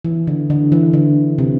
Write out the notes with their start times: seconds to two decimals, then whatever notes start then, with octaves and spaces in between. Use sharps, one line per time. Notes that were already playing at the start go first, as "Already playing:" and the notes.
0.05 E3
0.27 D3
0.50 D3
0.72 E3
0.93 D3
1.38 C3